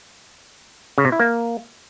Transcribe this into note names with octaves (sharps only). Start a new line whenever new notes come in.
C#3
C3
E4
A#3